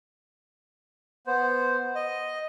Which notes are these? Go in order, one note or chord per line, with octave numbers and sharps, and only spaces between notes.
B3 C5
D#5